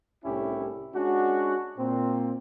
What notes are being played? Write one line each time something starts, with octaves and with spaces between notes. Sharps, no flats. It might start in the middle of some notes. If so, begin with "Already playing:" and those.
C2 A2 C#4 D4 E4 G4
G#3 C#4 D4 F#4
A#2 C4